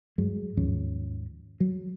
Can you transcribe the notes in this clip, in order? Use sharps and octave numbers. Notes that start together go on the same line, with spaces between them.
G2 F#3 G#3
D#2 G#2 F3 C#4
F#3